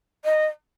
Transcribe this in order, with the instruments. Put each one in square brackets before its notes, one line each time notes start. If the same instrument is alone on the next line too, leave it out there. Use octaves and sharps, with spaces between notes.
[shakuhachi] D#5